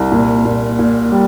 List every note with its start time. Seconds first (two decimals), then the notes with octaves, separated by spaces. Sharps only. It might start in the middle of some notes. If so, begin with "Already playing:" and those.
Already playing: C2
0.12 A#2
0.45 A#2
0.79 A#2
1.11 G3